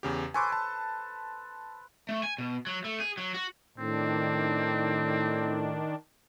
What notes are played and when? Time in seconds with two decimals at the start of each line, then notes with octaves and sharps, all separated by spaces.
0.03 E2 C#3 G4
0.34 A4 B4 C5 G#5 C#6 D6
0.52 A5
2.09 A3
2.23 G#5
2.38 B2
2.67 F#3
2.84 A3
3.00 G#4
3.18 F#3
3.34 F#4
3.78 A2 D#3 C4 D4